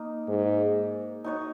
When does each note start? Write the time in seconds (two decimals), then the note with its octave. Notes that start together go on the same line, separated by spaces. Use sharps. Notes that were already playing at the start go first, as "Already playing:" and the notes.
Already playing: A#3 D#4
0.28 G#2
1.24 D#4 F#4 C#5